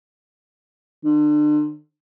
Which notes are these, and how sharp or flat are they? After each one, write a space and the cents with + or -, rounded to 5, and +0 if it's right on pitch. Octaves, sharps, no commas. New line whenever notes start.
D3 +35